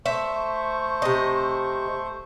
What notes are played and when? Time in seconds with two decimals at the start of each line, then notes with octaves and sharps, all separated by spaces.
0.06 A3 C5 E5 C#6
1.02 C3 D#5